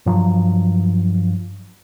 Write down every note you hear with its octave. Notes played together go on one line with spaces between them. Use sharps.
G2 F3 F#3